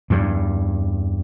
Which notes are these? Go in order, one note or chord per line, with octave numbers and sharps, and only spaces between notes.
E2 G2